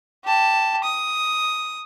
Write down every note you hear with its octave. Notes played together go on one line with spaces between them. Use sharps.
G4 A5
D#6